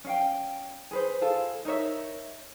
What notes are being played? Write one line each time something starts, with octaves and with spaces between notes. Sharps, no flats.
C#4 F5 G5
G#4 B4 C5
F4 G#4 A4 F5
D#4 A#4 C#5 E5